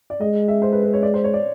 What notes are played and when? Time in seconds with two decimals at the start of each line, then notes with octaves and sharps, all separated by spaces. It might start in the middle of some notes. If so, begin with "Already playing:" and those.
0.10 D5
0.21 G#3 D#5
0.48 E5
0.62 C5
0.72 B4
0.83 B4
0.93 C#5
1.03 D5
1.14 C5
1.24 C#5
1.34 D5